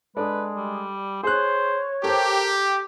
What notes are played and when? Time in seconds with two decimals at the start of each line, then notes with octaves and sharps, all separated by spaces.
0.16 G#3 D4 A4 B4 D5
0.56 G3
1.23 G#4 C5 C#5 F#6
2.04 G4 A4 A#4 C5